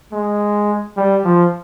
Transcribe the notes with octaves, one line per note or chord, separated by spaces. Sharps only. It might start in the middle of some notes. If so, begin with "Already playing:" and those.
G#3
G3
F3